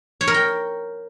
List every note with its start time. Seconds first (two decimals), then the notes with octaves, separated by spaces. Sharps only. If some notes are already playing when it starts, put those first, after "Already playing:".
0.21 C#5
0.27 A#4
0.34 G5